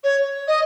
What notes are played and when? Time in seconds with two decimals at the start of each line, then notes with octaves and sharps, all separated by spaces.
0.04 C#5
0.48 D#5